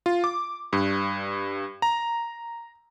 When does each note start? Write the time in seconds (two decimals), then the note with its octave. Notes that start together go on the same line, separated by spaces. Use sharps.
0.06 F4
0.24 D6
0.73 G2
1.82 A#5